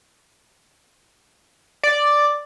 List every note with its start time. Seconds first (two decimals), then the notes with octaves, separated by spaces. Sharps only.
1.83 D5